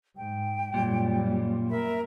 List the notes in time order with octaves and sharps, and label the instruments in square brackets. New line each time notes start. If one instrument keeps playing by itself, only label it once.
[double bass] G#2 [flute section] G5
[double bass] F#2 G3 [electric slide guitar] A#2
[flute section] A#4 E5 B5